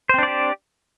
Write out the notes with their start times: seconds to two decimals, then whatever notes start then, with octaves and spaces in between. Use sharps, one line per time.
0.09 C5
0.14 C4
0.18 D4
0.23 D5
0.27 G4